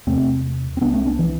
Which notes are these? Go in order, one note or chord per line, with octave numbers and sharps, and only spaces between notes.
E2 C3 A3 C4
C4
C2 C3 B3 D4
A3 C4
B3 D4
E3